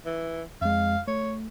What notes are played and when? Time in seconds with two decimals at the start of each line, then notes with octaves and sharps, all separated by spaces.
0.05 E3
0.62 F2 G#3 F5
1.08 A3 C#5